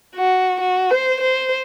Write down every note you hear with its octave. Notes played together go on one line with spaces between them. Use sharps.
F#4
F#4
C5
C5